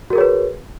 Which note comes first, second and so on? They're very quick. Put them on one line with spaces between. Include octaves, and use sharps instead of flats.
F#4 A#4 G#4 C#5 B4